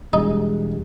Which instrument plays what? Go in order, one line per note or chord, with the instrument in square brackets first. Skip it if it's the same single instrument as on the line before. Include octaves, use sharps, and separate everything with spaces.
[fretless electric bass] E1 G#3 [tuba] G3 [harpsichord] D#4